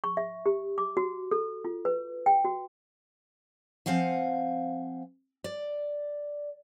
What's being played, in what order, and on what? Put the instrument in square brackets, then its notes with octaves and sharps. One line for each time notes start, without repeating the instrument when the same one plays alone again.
[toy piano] C#6
E5
G4
D6
F#4
A4
F4
B4
G5
F#4
[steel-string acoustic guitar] F3 C4 F5 F#5 G#5
D5